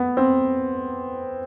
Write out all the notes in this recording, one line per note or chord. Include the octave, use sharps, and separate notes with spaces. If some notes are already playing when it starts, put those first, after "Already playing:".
Already playing: B3
C4